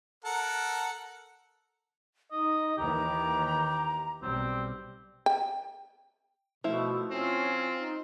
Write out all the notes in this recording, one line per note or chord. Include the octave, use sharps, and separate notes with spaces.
A4 A#4 F#5
D#4 D#5
D#2 D#3 E3 G4 A#5
B1 G3 C4
G5
B2 F3 A3 E4
C4 C#4 F4
D#4